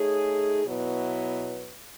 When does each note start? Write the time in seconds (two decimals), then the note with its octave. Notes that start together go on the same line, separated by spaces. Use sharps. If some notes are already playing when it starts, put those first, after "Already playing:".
Already playing: A3 D#4 G#4 C#5
0.65 B2 F#3 B3 E4 B4